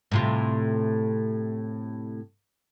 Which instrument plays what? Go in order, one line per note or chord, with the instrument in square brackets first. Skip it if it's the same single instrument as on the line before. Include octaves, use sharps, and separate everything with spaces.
[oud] A2 C3 F4